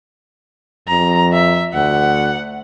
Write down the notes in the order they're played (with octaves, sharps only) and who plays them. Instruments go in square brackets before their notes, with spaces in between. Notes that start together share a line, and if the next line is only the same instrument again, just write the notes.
[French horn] F2 [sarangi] A#5
[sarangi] E5
[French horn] D2 [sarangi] F#5